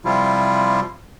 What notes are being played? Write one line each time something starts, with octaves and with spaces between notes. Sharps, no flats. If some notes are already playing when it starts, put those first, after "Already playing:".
C3 F3 G3 E4 F4